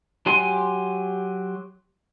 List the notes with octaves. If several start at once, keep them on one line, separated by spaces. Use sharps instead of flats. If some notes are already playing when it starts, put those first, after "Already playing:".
F#3 G4 G#5 C6